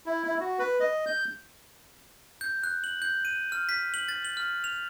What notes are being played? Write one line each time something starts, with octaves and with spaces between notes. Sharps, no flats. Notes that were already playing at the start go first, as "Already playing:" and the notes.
E4
E4
F#4
B4
D#5
G6
G6
F#6
F#7
G6
D#7
F6
B6
F#7
A6
F#7
F6
F7